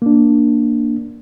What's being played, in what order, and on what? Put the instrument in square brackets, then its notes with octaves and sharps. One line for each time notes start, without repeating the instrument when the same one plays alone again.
[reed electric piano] A#3 D4